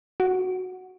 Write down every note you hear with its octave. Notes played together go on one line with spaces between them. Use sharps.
F#4